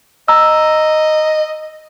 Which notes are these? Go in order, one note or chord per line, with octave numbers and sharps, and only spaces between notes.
D#5 A#5 E6